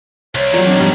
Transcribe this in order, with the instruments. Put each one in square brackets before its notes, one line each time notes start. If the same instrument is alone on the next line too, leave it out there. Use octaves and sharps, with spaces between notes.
[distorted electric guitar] C2 [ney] C#5
[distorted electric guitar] E2 D#3 [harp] F#3 A#4 [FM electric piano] F4 D5
[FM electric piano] F#3 C4 G6 [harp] D4 D#4
[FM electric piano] G#2 F3 B3 [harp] G3 C#4 D4